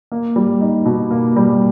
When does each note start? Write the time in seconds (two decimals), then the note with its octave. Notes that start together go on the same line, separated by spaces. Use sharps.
0.12 A#3
0.36 G3
0.61 D#4
0.86 B2
1.11 A#3
1.36 G3